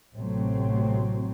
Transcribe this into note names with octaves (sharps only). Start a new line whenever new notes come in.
A1 C3 F#3 A3 C4